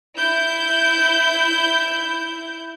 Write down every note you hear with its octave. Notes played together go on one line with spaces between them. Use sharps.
E4 G6